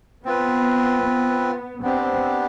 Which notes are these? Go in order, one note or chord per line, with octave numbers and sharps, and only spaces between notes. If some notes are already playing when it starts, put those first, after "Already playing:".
B3 C4 F4 B4
B3
B3 C4 D4 G4